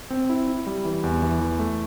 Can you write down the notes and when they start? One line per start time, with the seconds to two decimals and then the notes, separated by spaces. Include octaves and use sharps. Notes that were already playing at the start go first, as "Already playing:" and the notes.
0.10 C4
0.29 E4
0.48 E4
0.67 G3
0.85 E3
1.04 E2
1.22 E3
1.41 E3
1.59 A3